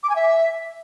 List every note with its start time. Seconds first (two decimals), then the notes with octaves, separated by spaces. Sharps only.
0.03 D6
0.10 G#5
0.16 E5